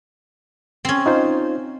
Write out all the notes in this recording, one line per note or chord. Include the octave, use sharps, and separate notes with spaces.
C4 C#4
D#4 F4 C5